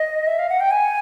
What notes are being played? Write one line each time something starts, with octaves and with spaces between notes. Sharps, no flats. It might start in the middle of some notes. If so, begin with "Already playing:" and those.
Already playing: D#5
E5
F5
F#5
G5
G#5